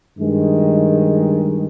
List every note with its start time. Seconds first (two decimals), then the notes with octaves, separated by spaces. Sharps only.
0.17 G2 D#3 G#3